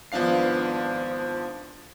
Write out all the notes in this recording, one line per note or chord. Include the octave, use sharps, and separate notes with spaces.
G#1 F3 B3 D4 F5 C7